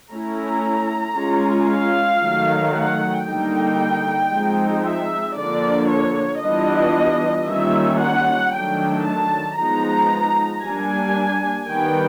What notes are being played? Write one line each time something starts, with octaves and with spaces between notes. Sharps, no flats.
A3 C#4 E4 A#5
G#3 C#4 F4
F5
D#3 F#3 A3
F#5
D3 G3 A#3 D#4 G5
F3 G#3 C4 D#4
E5
D3 F3 A#3 D4 D5
C#5
E3 G3 B3 D4 F4 D#5
D#3 G3 A#3 C#4 F4 E5
F#5
D#3 F#3 A3 D4 G5
A5
F3 G#3 B3 D#4 A#5
G3 A#3 D4 G#5
D#3 G3 B3 G5